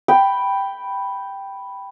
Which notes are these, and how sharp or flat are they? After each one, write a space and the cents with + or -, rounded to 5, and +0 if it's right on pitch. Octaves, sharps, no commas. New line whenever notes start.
G5 +0 B5 +0